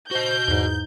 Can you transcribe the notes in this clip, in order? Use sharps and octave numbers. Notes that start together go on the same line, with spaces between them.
F#4 C5 D#5 G6
E2 G#2 D#4